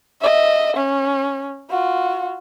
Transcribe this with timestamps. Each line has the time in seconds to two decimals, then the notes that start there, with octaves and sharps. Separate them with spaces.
0.21 D#5 E5
0.76 C#4
1.70 F4 F#4